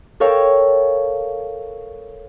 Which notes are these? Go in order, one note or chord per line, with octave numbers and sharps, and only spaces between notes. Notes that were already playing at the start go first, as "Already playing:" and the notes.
A4 A#4 C#5 F5 G5